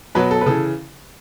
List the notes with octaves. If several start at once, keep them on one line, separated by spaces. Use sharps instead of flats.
B2 F#3 B4
A4
B4
C#3 E3 A4